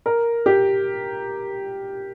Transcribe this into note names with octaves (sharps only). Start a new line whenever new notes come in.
A#4
G4